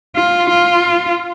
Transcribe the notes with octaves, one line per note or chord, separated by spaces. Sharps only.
F4
F4